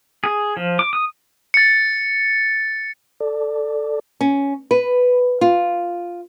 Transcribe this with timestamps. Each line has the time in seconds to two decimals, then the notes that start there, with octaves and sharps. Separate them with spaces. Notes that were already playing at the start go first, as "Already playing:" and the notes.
0.24 G#4
0.57 F3
0.79 D6
0.93 D#6
1.54 A6 C#7
3.20 A4 D5
4.21 C#4
4.71 B4
5.41 F4